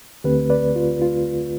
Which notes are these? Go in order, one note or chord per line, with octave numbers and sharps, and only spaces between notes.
D2 D3 A3 C4 G4 B4
B4 D5
F4
F4